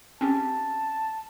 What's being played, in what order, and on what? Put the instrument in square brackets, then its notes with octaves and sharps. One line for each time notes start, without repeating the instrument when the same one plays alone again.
[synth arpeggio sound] C4 C#4 G4 [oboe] A5